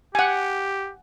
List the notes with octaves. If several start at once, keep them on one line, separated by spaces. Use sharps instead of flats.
G4 F#5 G#5